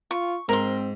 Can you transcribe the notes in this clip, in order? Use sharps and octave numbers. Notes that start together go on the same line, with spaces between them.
F4 C#6
G#2 C4 A#4 C6